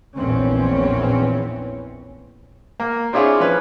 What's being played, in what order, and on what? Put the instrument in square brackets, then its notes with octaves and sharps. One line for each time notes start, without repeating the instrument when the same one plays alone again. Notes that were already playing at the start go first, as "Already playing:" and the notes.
[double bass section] A#1 E2 E3 C4 C#4
[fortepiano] A#3
C4 D4 E4 F4 G#4 C#5
F3 C#4 B4